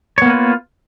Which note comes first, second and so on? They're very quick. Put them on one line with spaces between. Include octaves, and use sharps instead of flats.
C#5 B3 A#3 B4 F4